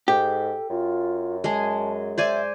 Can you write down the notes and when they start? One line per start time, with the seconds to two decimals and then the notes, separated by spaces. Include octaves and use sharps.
0.08 G#2 G4 A4
0.70 F#2 F4
1.44 G#3 G#4 A5
2.18 C5 D5 E5 G#5